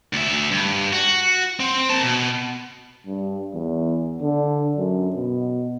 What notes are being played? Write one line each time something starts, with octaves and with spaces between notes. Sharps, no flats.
D2 E5
G2
F#4
C4
A#3 A5
B2
G2
E2
D3
F#2
B2